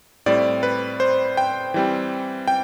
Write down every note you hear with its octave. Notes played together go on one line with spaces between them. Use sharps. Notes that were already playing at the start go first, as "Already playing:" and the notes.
A2 G3 C4 D5
B4
C5
G5
E3 G3 C4
G5